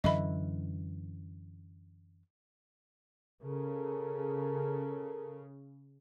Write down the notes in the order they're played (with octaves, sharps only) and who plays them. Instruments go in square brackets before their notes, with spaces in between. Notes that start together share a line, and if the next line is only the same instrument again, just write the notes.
[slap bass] F#2 D3 E3 [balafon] D#5 E5 B5
[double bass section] C#3 [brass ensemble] A4 A#4